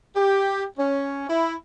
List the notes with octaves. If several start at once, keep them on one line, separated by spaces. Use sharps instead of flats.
G4
C#4
E4